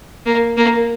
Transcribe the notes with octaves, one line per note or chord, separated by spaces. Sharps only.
A#3
A#3